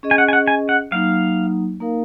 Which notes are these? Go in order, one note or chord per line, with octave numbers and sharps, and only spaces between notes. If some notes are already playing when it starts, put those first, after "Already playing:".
C#4 G#4 D#5
G#5
F#5
G#5
F#5
G#5
F#5
F#3 A#3 D#4 F5
A#3 D#4 A#4 F5